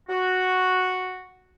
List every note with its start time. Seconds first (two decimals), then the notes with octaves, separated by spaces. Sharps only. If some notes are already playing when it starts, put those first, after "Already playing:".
0.09 F#4